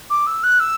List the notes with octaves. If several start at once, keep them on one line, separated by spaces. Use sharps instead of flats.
D6
E6
F#6
E6